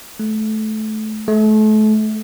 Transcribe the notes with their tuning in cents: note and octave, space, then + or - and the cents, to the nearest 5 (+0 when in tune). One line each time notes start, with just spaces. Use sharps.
A3 -20
A3 -35